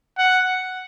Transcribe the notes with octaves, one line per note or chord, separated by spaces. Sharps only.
F#5